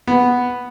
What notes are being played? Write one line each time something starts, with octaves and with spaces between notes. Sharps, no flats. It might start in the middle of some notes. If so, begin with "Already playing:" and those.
B3